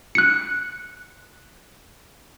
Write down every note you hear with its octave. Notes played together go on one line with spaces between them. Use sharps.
F#6 C#7